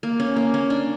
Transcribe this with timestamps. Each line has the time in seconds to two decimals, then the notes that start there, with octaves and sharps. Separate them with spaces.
0.03 A#3
0.20 C#4
0.36 A#3
0.54 C#4
0.70 D4